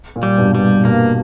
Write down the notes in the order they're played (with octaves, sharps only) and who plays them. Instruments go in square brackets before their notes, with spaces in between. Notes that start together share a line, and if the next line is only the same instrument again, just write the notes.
[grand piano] A#2
[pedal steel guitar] G3
[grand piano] G2 B2
[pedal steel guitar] G3
[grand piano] G2 B2 [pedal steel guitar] A#3